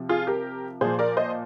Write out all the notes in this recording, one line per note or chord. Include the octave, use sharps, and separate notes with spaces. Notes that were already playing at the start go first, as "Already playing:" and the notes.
Already playing: C3 F3
F4 G#4
G4 A#4
A#2 F3 G#4 C5
A#4 D5
C5 D#5